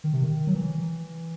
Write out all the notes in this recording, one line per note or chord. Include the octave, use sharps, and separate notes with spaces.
D#3
C3
D#3
F#3
E3